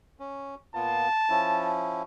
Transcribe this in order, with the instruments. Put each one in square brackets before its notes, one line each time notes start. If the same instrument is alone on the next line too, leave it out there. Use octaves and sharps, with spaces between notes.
[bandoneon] C#4
[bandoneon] A#2 B3 F4 [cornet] A5
[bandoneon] F3 C#4 E4